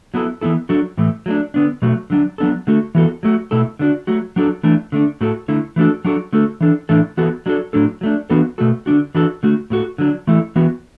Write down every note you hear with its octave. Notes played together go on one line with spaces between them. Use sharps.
F#3 B3 E4 A4
E3 B3 E4 A4
F#3 D4 F#4 A4
A2 E3 A3
F#3 A3 D4
D3 B3 D4
B2 F#3 A3 F#4
D3 F#3 D4
F#3 B3 D4 A4
D3 A3 F#4 A4
E3 B3 F#4 A4
F#3 A3 F#4
B2 A3 E4 A4
D3 A3 D4 F#4
F#3 A3 F#4
F#3 D4 F#4 A4
E3 A3 D4
D3 A3 D4
A2 A3 F#4 A4
D3 A3 E4
E3 A3 D4 F#4 A4
F#3 D4 F#4 A4
D3 A3 F#4 A4
E3 D4 A4
A2 E3 A3 D4 A4
E3 B3 F#4 A4
F#3 D4 F#4 A4
A2 F#3 D4 A4
F#3 A3 D4
E3 B3 D4 F#4 A4
B2 A3 F#4 A4
D3 A3 D4 F#4
E3 D4 F#4 A4
D3 A3 F#4
A2 A3 F#4 A4
D3 F#3 D4
E3 A3 E4 A4
E3 B3 F#4